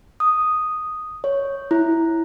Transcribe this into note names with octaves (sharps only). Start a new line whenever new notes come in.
D#6
C#5
E4